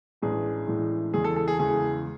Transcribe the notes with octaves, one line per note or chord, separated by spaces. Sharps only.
A1 A2 E3 G#3 D4 G#4
A1 A2 E3 G#3 D4
E2 C#3 E3 G#3 G#4
A4
A4
G#4
E2 C#3 E3 G#3 G#4